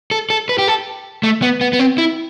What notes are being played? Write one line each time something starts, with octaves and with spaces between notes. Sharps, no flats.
A4
A4
B4
G4
A4
A3
B3
B3
B3
C4
E4